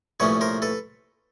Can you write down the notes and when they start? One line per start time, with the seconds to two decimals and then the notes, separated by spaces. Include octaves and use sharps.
0.20 C2 A#2 F3 A3 C#4 B4 C#5
0.41 A#4 C5
0.62 A4 B4